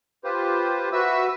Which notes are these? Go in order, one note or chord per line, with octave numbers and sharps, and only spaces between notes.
F4 G4 B4 C5
F#4 B4 E5 E6